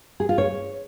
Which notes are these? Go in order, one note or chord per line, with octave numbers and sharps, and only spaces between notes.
G#4
F4
C#5